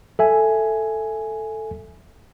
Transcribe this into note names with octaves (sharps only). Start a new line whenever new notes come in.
A4 E5 G#5